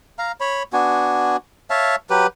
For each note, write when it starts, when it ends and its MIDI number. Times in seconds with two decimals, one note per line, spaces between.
0.19 0.32 77
0.19 0.32 82
0.40 0.63 73
0.40 0.63 83
0.73 1.37 59
0.73 1.37 62
0.73 1.37 66
0.73 1.37 80
1.70 1.96 73
1.70 1.96 76
1.70 1.96 77
1.70 1.96 81
2.10 2.27 54
2.10 2.27 67
2.10 2.27 71